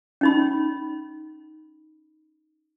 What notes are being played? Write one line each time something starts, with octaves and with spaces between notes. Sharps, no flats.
C#4 D#4 B5